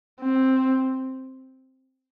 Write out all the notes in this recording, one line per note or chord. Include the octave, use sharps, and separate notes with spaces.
C4